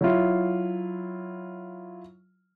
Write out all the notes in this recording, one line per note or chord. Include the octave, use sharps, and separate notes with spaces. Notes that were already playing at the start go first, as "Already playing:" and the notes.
F#3 E4 F4